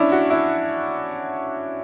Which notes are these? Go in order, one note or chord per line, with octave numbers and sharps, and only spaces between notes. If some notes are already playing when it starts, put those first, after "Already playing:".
Already playing: C#4 D4 E4
F#4
E4